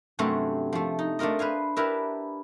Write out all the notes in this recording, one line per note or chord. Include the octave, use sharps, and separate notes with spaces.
G2 C3 F#3 A3 C4 C#4
F3 A3
D#4
A3 D4 F4 A#4 D#5
B4 C5 F5 G#5
D4 E4 G4 A#4 B4 E5